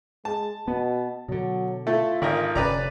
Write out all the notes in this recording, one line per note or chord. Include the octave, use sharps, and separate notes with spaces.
G#3 A5
B2 B3
B2 D3 F#3
A3 E4 F4 A4
G#1 D3 A#4 D#5
F1 G#2 D3 C#4 B4 D5 A#5